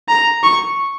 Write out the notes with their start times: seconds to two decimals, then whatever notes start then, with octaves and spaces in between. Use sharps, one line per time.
0.09 A#5
0.43 C#6